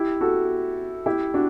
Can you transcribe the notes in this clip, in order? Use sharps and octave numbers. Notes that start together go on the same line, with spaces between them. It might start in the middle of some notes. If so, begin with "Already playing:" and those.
Already playing: E4 G4
F#4 A4
E4 G4
D4 F#4